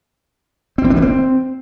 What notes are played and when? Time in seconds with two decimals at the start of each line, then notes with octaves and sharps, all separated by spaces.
0.78 C4
0.84 E3
0.90 D4
0.96 A#3
1.02 C4